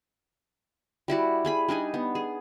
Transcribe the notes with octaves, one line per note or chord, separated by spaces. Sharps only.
G3 E4 F#4 D5
G3 G#4 B5
G3 D4 D#4 G#5
B3
G#4